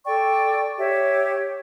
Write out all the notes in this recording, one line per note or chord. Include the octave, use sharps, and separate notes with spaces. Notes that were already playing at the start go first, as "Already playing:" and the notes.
A4 D5 G5 C#6
G4 C#5 E5